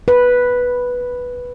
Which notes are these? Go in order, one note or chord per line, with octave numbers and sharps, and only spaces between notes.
B4